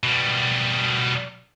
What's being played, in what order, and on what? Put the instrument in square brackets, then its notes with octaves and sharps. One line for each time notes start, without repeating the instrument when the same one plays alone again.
[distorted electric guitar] B2 G3